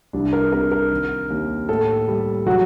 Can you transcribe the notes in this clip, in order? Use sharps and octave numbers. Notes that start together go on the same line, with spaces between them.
C2 D4
A#4
C3 A#4
A#4
D#3
D#2
A2 A4
G3
F#3 F#4